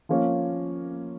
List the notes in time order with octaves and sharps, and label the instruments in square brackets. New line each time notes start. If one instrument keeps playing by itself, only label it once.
[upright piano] F3 A#3 C#4